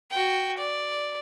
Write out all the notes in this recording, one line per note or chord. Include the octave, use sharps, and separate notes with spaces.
F#4 G5
D5